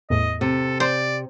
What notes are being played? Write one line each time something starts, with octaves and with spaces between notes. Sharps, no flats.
E2 A2 D#5
C3 A4
C5 D5